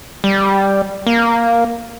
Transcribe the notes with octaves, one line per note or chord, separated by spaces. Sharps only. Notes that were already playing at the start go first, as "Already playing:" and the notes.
G3
A#3